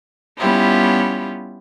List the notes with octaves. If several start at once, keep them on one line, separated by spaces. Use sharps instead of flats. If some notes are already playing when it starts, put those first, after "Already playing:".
G3 B3 C#4 E4 F4 G4